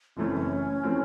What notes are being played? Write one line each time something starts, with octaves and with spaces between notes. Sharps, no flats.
F#1 F#2 E3 A3 C4 C#4
E3 A3 C4